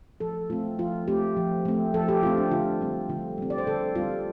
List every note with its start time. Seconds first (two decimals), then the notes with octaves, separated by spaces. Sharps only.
0.20 F3 A4
0.50 A3 C4 F4
0.79 F3 F4
1.07 A3 C4 G4
1.37 F3
1.65 A3 C4
1.94 F3 A4
2.08 G4
2.23 A3 C4 F4
2.37 D4
2.51 D3 F4
2.81 G3 C4
3.09 D3 F4
3.38 G3 C4
3.50 D5
3.58 C5
3.67 D3 A4
3.95 G3 C4 F4